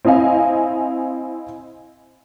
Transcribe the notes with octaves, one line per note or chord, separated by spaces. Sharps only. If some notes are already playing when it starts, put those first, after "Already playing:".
C4 E4 D#5 F5 G#5